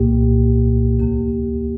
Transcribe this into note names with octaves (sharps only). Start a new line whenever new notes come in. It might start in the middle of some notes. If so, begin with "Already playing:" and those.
Already playing: C2 A#2 A#3 G4
D2 C3 A#3 G4